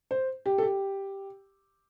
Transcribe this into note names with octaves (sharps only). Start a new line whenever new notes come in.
C5
G4
A4
G4